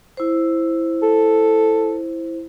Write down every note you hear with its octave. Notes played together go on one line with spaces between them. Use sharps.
E4 C5
A4